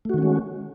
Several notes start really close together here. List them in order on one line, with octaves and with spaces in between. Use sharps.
A3 F#4 D#3 C#4 G#3